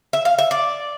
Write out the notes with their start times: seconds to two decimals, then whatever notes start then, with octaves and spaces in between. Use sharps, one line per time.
0.13 E5
0.25 F5
0.39 E5
0.51 D5